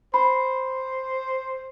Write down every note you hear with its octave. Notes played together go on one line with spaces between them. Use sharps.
C5 B5